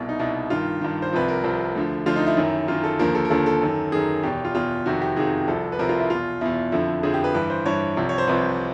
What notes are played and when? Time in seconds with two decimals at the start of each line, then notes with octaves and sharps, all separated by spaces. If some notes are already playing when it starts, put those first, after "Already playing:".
Already playing: C2 B2 E4
0.09 D#4
0.19 C2 B2 E4
0.50 G2 D#3 F4
0.81 G2 D#3
1.02 C5
1.13 C2 C3 F3 B4
1.28 A#4
1.44 C2 C3 F3
1.75 D2 D3 F3
2.06 D2 D3 F3 F4
2.16 D#4
2.27 E4
2.37 F#2 D#3
2.68 F#2 D#3 F4
2.84 A4
2.99 D#2 D3 F3 A#4
3.15 A4
3.25 A#4
3.30 D#2 D3 F3 A4
3.46 A4
3.62 F#2 D#3
3.92 F#2 D#3 G#4
4.23 E2 B2 G4
4.45 F4
4.55 E2 B2 F4
4.86 F2 C3 D#3 F#4
5.02 G4
5.17 F2 C3 D#3 G#4
5.48 C2 C3 F3 A4
5.72 B4
5.79 C2 C3 F3 A#4
5.89 F4
6.00 E4
6.10 E2 B2 F4
6.41 E2 B2 E4
6.72 F2 D3 F3 E4
7.03 F2 D3 F3 G#4
7.14 G4
7.24 B4
7.34 G2 E3 B4
7.50 C5
7.66 G2 E3 C#5
7.97 C2 C3 F3
8.09 C#5
8.18 C5
8.27 C2 C3 F3 B4